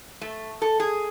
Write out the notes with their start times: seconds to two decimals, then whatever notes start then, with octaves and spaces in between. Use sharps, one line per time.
0.21 A3
0.62 A4
0.80 G#4